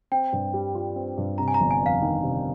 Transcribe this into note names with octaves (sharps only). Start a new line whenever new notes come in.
C4 G5
G2
G3
F4
C4
G2
C3 A#5
G#5
A#5
G1
G#5
F2 F5
D#3
C3